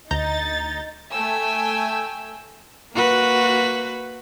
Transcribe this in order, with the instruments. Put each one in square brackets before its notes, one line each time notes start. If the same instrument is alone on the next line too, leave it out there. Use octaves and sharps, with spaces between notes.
[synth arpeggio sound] D2 A#5 G6 [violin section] D#4 A6
[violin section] A3 G5 G#5 E6
[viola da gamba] A#3 F#4 B4